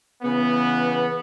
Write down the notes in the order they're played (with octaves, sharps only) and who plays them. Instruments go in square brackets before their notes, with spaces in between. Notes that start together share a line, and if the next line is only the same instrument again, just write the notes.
[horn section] C#3 E3 B3